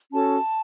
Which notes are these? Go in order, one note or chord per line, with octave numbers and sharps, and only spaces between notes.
C#4 F#4 A4 A5